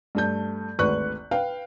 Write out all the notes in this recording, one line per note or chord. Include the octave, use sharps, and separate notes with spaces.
G2 A3 G6
G#1 D2 B4 C#6 F#6
B4 F5 G5